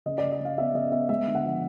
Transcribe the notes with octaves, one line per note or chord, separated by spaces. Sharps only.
C#3 D#5
D5
C#3
D#5
C#3 F5
B3 E5
C#3 D#5
B3 E5
G#3 E5
D3
F#5
F3